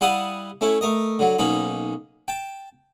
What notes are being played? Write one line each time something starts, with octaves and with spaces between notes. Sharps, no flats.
G3 E4 F5 F#5 A5 D#6
A3 C#4 E4
A3 A#4 D#5
D3 F#3
B1 A#3 C#4 D#4 B5
G5 A5